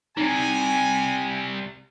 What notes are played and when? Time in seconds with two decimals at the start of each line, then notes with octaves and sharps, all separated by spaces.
0.17 C3 G3 D#4 G#5